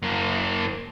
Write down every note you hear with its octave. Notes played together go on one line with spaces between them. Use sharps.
F#2 A#3